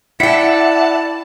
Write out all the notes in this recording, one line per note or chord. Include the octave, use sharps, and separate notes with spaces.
E4 D5 E5 F#5 G5 A5